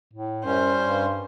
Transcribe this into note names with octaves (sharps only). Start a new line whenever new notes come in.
A2
F#2 G3 C#4 C5
G2